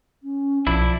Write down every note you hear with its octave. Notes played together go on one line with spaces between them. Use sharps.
C#4
B1 F3 D4 E4